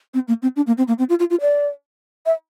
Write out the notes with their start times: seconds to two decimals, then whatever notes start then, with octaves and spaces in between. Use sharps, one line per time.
0.14 C4
0.28 A#3
0.42 C4
0.56 D4
0.67 A#3
0.78 C4
0.88 A#3
0.99 C4
1.09 F4
1.19 F4
1.30 F4
1.41 D5
2.26 E5